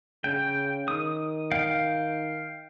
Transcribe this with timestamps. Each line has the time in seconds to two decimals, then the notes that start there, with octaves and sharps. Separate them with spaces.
0.24 C#3 G5
0.88 D#3 D#6
1.51 F5 G5